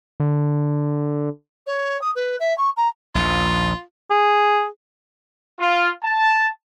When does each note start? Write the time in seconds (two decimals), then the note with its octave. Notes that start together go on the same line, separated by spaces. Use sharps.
0.20 D3
1.66 C#5
2.01 D#6
2.15 B4
2.39 E5
2.57 C#6
2.76 A#5
3.15 A#1 D#2 F4
4.11 G#4
5.60 F4
6.04 A5